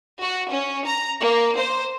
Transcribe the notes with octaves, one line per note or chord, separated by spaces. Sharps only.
F#4
C#4
A#5
A#3
C5